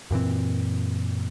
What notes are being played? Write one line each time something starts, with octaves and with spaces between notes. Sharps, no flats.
F#2 A#2 E3 C4